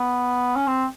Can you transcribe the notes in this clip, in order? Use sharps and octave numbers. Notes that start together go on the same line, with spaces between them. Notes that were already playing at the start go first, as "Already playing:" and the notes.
Already playing: B3
C#4
C4